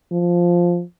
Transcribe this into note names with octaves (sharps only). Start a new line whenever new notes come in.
F3